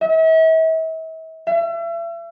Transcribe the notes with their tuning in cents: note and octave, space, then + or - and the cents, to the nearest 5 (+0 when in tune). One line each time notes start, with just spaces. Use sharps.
E5 -40
E5 +40